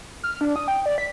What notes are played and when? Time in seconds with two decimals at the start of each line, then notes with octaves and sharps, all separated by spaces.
0.23 F6
0.41 D4
0.56 D#6
0.68 G5
0.86 D5
0.98 B6